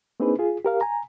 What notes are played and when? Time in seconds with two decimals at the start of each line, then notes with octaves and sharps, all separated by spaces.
0.20 A#3 C4 D4 D#4 G#4 B4
0.39 F4 G#4
0.65 G4 A#4 F5
0.81 G#5 A#5